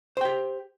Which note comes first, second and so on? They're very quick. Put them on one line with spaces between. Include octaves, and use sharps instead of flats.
C5 G5 G4